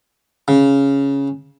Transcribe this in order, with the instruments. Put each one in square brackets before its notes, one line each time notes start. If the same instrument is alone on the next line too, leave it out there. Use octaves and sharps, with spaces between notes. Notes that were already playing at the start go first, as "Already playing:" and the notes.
[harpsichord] C#3